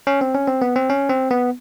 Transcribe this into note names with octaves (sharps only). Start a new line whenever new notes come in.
C#4
C4
C#4
C4
B3
C4
C#4
C4
B3